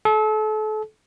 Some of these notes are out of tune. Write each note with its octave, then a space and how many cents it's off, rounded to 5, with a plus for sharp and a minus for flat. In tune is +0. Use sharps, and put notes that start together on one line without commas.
A4 -35